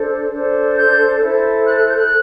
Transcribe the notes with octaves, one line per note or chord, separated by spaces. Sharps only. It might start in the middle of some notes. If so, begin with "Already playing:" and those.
Already playing: D4 A4 C5
D4 A4 C5
G6
E4 A4 C5
F#6
F#6
G6
F#6